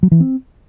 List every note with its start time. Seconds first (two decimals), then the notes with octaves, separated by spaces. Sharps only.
0.03 F#3
0.12 E3
0.20 C4